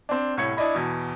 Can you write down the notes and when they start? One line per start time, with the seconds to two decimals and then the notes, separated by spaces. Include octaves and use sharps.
0.09 C4 D4
0.37 C2 A2 C#5 G#6 C#7
0.57 D4 E4 D5 D#5 B5
0.75 E2 B2